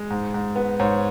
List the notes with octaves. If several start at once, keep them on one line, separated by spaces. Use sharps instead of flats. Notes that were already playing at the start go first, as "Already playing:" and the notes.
Already playing: G#3
G#2
G#2
B3
G#2 C#5